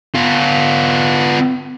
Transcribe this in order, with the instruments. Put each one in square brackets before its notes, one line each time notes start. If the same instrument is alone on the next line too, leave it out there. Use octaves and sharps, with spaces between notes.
[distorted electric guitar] B3 F4